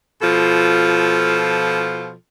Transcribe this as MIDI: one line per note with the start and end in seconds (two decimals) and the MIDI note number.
0.22 2.13 47
0.22 2.13 53
0.22 2.13 65
0.22 2.13 69